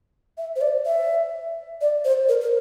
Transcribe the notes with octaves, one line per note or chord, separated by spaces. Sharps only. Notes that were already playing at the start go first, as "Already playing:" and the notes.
E5
C5
D5
E5
D5
C5
A#4
A#4